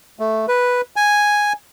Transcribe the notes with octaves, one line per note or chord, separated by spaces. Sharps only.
A3
B4
G#5